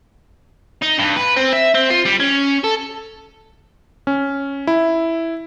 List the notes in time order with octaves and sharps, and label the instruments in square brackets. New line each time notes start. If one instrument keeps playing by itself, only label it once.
[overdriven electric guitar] D#4
G2
B4
C4
E5
C4
F4
G3
C#4
A4
[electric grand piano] C#4
E4